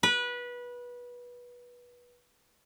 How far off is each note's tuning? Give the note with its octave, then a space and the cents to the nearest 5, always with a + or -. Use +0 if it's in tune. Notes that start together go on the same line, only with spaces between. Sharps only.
B4 -20